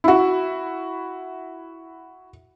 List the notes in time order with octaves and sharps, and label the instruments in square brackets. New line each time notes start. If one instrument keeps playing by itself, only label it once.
[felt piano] E4 F#4